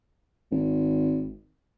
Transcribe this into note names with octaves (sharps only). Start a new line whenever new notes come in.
G#1